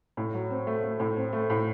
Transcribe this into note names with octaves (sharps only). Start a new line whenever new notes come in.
A2
F#3
C4
A3
A3
A2
C4
A3
A2